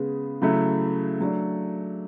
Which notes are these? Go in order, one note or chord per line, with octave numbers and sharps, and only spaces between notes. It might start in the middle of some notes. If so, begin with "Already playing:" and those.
Already playing: C#3 G#3 B3
C#3 F#3 A3 E4
F#3 A3 D4